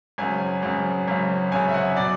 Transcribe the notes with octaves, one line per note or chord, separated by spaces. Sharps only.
G#1 F#2 C#3 G#5
G#1 F#2 C#3
G#1 F#2 C#3
G#1 F#2 C#3 G#5
E5
F#5
B2 F#3 D5